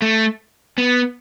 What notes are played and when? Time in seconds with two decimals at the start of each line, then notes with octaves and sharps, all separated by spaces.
0.02 A3
0.78 B3